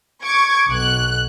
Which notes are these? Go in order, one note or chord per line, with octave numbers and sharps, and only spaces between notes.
C#6 D6 G#6
B1 F#6